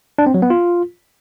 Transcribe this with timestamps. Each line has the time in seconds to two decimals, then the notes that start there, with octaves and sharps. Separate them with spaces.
0.18 D4
0.26 C4
0.34 F#3
0.42 B3
0.50 F4